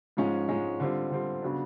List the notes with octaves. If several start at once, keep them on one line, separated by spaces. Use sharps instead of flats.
G#2 F3 G#3 C#4
G#2 F3 G#3 C#4
D3 G3 C4 F4
D3 G3 C4 F4
C#3 F#3 B3 D4